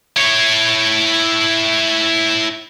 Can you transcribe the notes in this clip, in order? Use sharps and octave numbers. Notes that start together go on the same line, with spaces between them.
E4 C#5